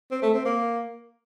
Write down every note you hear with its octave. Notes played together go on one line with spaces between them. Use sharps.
C4
A3
C4
A#3